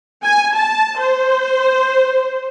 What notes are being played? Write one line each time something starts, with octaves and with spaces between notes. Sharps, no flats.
G#5
A5
C5